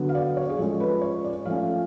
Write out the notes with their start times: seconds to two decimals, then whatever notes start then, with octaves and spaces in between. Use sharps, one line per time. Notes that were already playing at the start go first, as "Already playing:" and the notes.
Already playing: D3 F#3 B3
0.09 F5
0.14 D5
0.37 C#5
0.50 G#4
0.58 F3 G#3 C#4 A4
0.80 B4
1.02 C#5
1.24 D5
1.45 F3 A3 C#4 F5